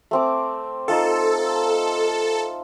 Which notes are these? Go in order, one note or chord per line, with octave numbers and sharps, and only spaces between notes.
A3 C4 D6
D#4 F4 A4 A5